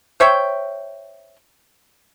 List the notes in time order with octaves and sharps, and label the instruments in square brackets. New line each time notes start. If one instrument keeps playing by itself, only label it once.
[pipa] C5 C#5 E5 G5